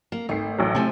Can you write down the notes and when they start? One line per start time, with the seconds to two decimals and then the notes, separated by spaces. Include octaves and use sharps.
0.12 A#3
0.29 G#1 A3 C7
0.58 A1 F#3
0.75 C3 A3 C4 G#5